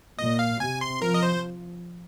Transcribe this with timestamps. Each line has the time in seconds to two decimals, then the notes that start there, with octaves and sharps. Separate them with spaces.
0.19 A#2 D#5
0.39 F5
0.60 C3 G#5
0.81 C6
1.02 F3 A#4
1.14 D#5
1.23 C5